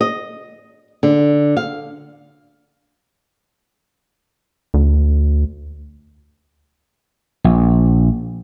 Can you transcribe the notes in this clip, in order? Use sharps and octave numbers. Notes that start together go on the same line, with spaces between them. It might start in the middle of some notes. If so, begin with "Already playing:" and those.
D#5
D3
F5
D2
A#1